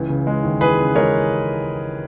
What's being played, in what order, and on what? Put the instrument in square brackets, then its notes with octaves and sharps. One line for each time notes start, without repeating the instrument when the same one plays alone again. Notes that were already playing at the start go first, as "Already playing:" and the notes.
Already playing: [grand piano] C#2 E3
C#3
G#3
D#2
E3 G#4 B4
C#3
G#3 A#4 C#5